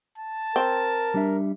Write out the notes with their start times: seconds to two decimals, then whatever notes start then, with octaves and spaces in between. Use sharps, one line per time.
0.18 A5
0.56 C4 A#4
1.14 G3 D4 E5